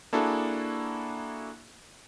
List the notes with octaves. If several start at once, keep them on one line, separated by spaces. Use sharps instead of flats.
A#3 D4 E4 F#4 G#4 A4